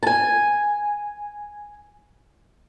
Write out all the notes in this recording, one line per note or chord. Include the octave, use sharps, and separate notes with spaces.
G#5 A5